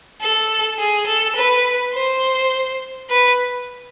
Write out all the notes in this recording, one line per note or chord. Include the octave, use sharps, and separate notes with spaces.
A4
G#4
A4
B4
C5
B4